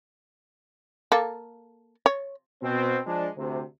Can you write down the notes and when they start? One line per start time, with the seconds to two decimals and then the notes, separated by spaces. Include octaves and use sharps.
1.12 A#3 A4
2.06 C#5
2.63 B2 C4
3.06 F3 G#3 D4
3.37 D2 C3